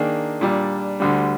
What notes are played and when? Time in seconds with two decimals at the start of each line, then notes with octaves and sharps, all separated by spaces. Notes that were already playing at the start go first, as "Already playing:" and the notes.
Already playing: D#3 A#3 D4 G#4
0.41 A#2 G3 D4
1.00 D2 D3 G3